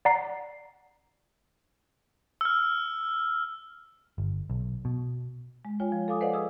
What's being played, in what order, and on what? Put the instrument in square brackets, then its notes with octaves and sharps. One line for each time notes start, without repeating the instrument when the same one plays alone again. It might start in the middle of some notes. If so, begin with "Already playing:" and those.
[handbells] D5 F#5 A#5 C7
[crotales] E6 F6
[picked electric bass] G1
B1
B2
[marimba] G#3
F4 C#5 G5 G#5
F3
A4 F5 G#5 D6 D#6
B4 C5 D5 D#5 F5 F#5
G#4 D#6 E6